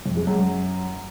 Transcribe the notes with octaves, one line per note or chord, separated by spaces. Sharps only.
F2
G#3
F#2